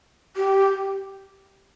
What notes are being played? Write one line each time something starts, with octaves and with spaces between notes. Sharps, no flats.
G4